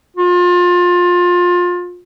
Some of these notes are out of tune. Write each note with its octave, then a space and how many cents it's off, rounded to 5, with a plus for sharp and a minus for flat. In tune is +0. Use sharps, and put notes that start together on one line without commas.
F4 +25